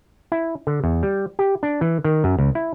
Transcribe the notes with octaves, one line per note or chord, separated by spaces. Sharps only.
E4
D3
E2
G3
G4
D4
E3
D#3
F#2
C#2
E4